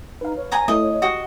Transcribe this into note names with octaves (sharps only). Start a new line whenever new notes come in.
D#4 B4 F5
C#5
G#5 A#5 D#6
A3 E4 A4 D#5
F#4 G4 D#5